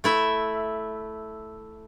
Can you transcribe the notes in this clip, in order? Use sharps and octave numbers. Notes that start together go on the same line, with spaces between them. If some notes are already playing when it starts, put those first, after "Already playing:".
A3 E4 E5